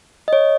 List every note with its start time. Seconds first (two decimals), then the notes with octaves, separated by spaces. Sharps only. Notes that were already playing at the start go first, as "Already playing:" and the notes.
0.28 D#5
0.33 C#5